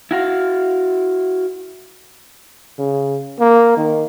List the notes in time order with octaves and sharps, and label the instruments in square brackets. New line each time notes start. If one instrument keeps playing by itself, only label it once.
[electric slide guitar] E4 F#4 F5
[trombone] C#3
A#3
D#3